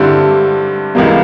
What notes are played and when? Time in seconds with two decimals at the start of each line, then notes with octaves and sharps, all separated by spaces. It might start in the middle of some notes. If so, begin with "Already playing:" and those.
Already playing: G2 D3 G3 C4 E4
0.95 C#2 C3 E3 G3 A#3